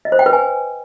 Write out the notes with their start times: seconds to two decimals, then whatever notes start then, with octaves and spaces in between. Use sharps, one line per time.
0.05 D#5
0.12 C5
0.19 G5
0.26 B4
0.33 G#5